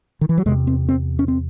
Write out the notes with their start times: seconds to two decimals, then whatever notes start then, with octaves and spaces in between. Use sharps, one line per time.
0.21 D#3
0.29 E3
0.38 F#3
0.46 E2 C3 G#3
0.67 C4
0.89 C4
1.19 C#4
1.28 C4